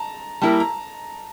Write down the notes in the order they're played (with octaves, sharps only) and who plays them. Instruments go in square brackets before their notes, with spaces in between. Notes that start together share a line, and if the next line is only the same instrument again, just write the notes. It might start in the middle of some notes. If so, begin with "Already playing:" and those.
Already playing: [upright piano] A5 A#5
[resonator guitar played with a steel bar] G3 A#3 E4 A#4 [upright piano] A5
[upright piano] A#5